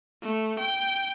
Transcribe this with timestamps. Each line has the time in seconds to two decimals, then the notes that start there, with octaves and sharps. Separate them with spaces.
0.22 A3
0.59 G5